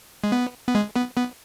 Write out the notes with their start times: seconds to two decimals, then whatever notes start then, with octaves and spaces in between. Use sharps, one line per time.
0.24 G#3
0.32 B3
0.68 B3
0.75 G#3
0.96 B3
1.17 B3